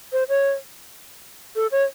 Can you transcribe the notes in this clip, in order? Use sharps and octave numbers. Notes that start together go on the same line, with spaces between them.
C5
C#5
A4
C#5